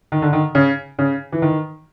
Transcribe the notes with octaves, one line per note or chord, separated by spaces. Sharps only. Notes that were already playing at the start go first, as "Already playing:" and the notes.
D#3
D3
D#3
C#3
C#3
E3
D#3